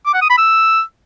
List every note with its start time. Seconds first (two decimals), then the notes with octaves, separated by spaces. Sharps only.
0.06 D6
0.14 F#5
0.22 D#6
0.30 B5
0.38 E6